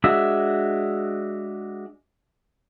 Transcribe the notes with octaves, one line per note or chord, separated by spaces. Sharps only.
G#3 D4 F#4 E5